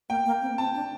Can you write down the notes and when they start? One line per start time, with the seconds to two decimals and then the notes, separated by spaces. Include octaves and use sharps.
0.09 A#3 G5
0.26 A#3
0.42 C4
0.58 C4 A5
0.75 D4